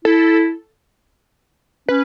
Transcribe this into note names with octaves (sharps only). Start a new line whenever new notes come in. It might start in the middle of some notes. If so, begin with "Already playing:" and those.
E4 A4
C#4 B4